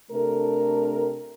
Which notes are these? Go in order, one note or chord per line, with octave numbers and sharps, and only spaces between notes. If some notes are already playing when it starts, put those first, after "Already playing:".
C3 A3 D4 A4 A#4